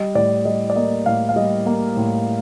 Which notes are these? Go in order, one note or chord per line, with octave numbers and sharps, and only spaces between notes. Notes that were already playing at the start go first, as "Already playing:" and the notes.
Already playing: G3 D#5
A2 D5
G3 D#5
D5
A#3 D#5
A2 F5
F5
G3 D#5
A#3
A2